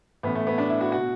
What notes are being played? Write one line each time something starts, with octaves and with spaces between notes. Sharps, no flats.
A1 A2 E3 B3
A3
B3
D4
E4
F#4
B2 F#4